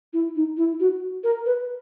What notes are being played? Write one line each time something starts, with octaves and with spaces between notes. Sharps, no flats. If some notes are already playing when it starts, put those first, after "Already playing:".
E4
D#4
E4
F#4
A#4
B4